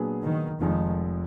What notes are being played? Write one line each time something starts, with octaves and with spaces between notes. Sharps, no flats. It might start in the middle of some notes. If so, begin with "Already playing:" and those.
Already playing: A#2 F#3 B3 D4 G#4
D#3
F1 F2 D#3 F3 G#3